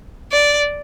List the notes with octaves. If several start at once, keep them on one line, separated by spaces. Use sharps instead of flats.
D5